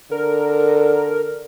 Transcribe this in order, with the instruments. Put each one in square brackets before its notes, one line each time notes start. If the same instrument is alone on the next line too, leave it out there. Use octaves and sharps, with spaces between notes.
[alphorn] D3 [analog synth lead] A#4